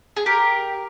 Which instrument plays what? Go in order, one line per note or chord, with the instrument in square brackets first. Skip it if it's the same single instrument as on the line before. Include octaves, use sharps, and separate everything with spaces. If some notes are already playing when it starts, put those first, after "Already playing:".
[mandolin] G#4
G4 A#4